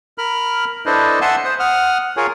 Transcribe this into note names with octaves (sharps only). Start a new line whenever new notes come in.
A#4 B5 F6
D4 E4 A4 B4 C5 D#5
E5 F#5 G#5 A5 C6 E6
C5 D#6
F#5 D#6 F6
F4 G#4 A#4 C#5 G#5